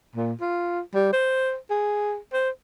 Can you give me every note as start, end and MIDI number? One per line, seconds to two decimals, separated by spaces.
0.16 0.33 46
0.41 0.80 65
0.95 1.09 55
1.13 1.57 72
1.70 2.17 68
2.33 2.50 72